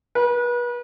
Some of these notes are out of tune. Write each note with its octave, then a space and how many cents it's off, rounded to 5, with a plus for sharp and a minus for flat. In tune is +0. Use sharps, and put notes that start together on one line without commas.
B4 -35